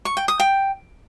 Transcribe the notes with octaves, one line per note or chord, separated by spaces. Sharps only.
C#6
G5
D#6
G5